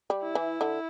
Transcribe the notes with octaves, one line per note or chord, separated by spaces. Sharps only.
G3
E4
E3
D3